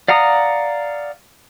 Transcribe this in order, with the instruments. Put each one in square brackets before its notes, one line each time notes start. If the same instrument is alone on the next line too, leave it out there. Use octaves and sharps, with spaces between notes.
[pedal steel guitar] D5 F5 F#5 A#5 D#6